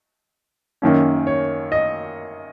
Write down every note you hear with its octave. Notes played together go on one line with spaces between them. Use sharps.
F#2 D#3 A#3 C#4
C#5
D#5